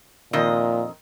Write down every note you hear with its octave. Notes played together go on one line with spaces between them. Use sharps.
F2 A#2 D#3 D#5